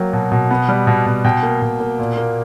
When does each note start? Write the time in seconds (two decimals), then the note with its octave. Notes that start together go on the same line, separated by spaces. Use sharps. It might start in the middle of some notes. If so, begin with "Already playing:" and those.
Already playing: F#3 A#3 G5
0.13 B2
0.32 B2
0.51 B3
0.69 G3
0.87 B2
1.06 B2
1.25 B2 G5
1.43 A#3
1.62 B2
1.80 A#3
1.99 A#2
2.17 A#3